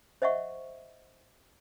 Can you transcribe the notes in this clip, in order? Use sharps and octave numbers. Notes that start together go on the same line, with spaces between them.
C5 D#5 E5 F#5 C#6